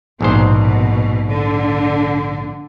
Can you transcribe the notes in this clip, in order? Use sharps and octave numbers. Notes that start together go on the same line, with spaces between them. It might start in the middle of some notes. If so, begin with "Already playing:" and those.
A#1 G#2 B2 C5
D3